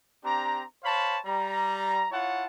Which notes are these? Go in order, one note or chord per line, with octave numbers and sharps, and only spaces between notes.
C4 D4 G4 A#5
C5 C#5 F5 A5 B5
G3 A#5
E4 F4 C#5 F#5 A5